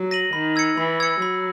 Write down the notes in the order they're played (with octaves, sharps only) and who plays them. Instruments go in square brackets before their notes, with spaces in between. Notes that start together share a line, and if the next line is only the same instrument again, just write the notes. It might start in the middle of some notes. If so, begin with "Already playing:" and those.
Already playing: [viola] F#3
[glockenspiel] A#6 D#7 F#7
[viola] D#3 [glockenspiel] B5
[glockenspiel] E6 G#6 C#7
[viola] E3 [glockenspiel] B5
[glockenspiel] E6 G#6 C#7
[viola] F#3 [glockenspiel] B5